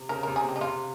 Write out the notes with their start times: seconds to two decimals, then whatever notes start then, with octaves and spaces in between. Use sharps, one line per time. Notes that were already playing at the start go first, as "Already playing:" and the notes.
Already playing: C3
0.09 C#3 A#4
0.23 C3 A#4
0.36 G#4
0.44 C3
0.49 G4
0.56 D#4
0.61 C3 F4